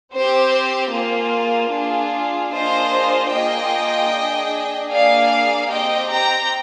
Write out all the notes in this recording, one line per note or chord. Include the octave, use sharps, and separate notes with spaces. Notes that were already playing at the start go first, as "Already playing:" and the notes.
C4 G4 C5
A#3 F4 G#4
D4 F4 G#4
A#3 D4 F4 G#4 C5 D#5
A#3 F4 G#4 D#5 G5
D4 G#4
A#3 D4 G#4 D5 F5
C4 G4 D#5 G5
G5 A#5